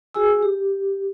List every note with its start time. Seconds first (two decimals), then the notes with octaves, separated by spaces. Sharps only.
0.14 F#4 G#4 G#5 E6
0.43 G4